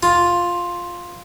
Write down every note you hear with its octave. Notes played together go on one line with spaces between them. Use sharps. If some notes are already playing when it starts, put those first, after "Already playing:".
F4